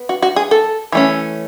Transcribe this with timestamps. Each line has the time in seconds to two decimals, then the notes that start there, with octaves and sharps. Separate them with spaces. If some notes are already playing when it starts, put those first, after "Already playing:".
Already playing: B3
0.09 F#4
0.22 F#4
0.36 G#4
0.51 A4
0.92 E3 A3 C#4